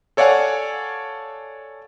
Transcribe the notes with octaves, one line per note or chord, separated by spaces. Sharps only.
A4 C#5 D5 F5 F#5 G#5